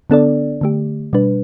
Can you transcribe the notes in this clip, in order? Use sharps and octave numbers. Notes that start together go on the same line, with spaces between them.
D3 B3 D4 A4 D5
D3 A3 G4
B2 G3 D4 B4